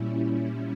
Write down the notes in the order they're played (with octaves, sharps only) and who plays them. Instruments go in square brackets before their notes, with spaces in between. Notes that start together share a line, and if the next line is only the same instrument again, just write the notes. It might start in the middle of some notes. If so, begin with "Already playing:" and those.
Already playing: [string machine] A#2 G3 C#4 E4